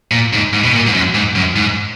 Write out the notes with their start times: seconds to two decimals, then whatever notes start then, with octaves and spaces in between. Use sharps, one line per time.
0.11 A#2
0.33 G#2
0.53 G#2
0.64 B2
0.74 A#2
0.87 G#2
0.94 F#2
1.14 G#2
1.35 F#2
1.56 G#2